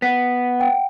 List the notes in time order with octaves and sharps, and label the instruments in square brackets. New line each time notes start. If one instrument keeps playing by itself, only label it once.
[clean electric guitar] B3 [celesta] B6
[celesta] F#5 G5